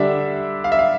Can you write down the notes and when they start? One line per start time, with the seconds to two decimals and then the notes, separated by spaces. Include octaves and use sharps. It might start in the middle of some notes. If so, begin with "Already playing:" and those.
Already playing: D3 G3 D4 E5
0.64 F5
0.72 E5
0.79 F5